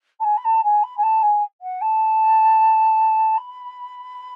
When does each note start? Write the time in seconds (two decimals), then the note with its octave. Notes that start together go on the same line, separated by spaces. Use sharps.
0.20 A5
0.24 G#5
0.37 B5
0.44 A5
0.64 G#5
0.83 B5
0.97 G#5
1.03 A5
1.22 G#5
1.61 F#5
1.81 A5
3.37 B5